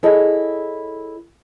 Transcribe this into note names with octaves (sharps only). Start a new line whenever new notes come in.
E4 G#4 A4 C#5 D#5